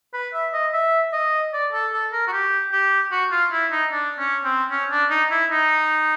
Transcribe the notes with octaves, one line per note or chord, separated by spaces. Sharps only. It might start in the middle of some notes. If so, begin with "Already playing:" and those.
B4
E5
D#5
E5
D#5
D5
A4
A4
A#4
F#4
G4
G4
F#4
F4
E4
D#4
D4
C#4
C4
C#4
D4
D#4
E4
D#4